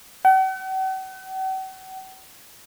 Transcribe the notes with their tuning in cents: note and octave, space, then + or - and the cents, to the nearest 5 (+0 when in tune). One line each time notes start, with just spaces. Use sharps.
F#5 +45